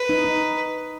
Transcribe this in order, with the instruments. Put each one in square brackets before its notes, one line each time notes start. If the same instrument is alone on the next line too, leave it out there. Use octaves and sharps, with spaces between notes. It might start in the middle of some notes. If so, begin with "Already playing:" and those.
Already playing: [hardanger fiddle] B4
[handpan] D#4
D#4